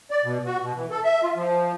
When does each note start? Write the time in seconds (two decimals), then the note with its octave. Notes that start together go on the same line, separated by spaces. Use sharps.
0.11 D5
0.24 B2
0.45 F#4
0.62 B2
0.76 E3
0.90 A4
1.04 E5
1.22 F4
1.36 F3